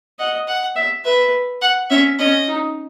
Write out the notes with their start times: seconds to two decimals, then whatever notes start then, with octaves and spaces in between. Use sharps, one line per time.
0.19 D#5 F#5
0.47 F#5
0.76 E5
1.05 B4 E5
1.61 F#5
1.90 C#4 E5
2.19 C#4 D#5
2.48 D#4